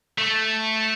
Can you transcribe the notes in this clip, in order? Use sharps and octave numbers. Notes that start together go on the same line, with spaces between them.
A3